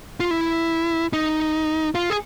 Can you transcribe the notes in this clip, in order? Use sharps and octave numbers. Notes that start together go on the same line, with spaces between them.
F4
E4
D#4
F4
G#4